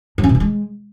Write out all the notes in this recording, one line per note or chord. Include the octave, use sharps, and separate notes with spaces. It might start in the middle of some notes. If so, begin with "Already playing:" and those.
F#3
C#4
B2
B3
G#3